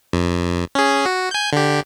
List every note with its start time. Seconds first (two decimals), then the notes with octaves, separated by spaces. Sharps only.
0.13 F2
0.75 C#4 G#4
1.06 F#4
1.31 G#5 G6
1.53 D3 G4